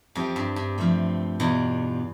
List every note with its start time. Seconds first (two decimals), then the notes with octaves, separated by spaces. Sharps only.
0.15 F2 G3 C4 G4
0.36 G2
0.56 G2
0.78 C3 F3 A3 C4
1.40 E2 B2 G3 D4 F4